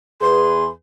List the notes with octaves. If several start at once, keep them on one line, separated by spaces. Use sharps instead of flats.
E2 G#4 B4 C6